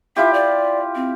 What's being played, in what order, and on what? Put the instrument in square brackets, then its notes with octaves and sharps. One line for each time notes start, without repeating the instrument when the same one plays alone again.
[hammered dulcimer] E4 F4 G4 [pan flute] E5
[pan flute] D5
C4